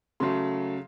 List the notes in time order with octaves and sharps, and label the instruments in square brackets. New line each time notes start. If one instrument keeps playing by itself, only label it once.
[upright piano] C#3 F#3 A3 C6